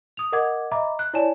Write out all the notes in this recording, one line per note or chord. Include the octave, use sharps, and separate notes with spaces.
D#6 F7
A#4 D#5 F#5 D6 G#6
D#5 E5 A#5 B5 D6
F#6
E4 C#5 D5 G#5 A5 E7